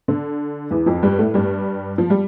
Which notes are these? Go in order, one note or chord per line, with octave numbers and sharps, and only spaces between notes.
D3
E2 E3
F2 F3
G2 G3
A2 A3
G2 G3
F3
G3